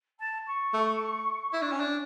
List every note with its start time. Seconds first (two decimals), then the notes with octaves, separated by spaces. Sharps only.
0.19 A5
0.47 C#6
0.73 A3
1.53 E4
1.62 D4
1.71 C#4
1.80 D4